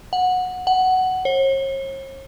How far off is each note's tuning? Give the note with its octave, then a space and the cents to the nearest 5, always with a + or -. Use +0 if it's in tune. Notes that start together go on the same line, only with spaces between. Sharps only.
F#5 -15
F#5 +10
C#5 -45